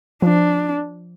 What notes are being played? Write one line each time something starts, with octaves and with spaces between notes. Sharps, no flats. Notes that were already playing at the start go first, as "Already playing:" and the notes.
F3 D4